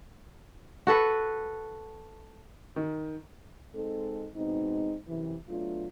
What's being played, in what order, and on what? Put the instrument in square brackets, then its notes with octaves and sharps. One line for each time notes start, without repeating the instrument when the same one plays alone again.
[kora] F#4 A4 B4
[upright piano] D#3
[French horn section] G#3 C4 D#4 A4
B2 G#3 C4 D#4
F#2 C3 E3
F#3 A3 B3 D4 F4